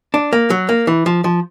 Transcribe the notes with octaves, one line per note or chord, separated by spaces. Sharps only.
D4
A#3
F#3
A#3
E3
F3
F3